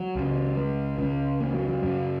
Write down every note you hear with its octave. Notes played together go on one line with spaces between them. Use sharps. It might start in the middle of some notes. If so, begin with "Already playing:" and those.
Already playing: F#3
C#2 C#3
G#3
C#2 C#3
A#3
F#3
F#3
F#2 C#3